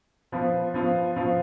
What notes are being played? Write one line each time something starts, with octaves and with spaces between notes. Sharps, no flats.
F3 B3 F4
F3 B3 F4
F3 B3 F4